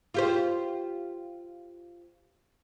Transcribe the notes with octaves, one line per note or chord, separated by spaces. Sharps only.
F4 G4 C5